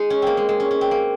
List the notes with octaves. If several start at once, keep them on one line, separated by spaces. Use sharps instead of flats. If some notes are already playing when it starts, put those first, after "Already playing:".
Already playing: G#3 D#4
C#4
A#3 C4
G#3
G#3
C#4
C#4
C4
A#3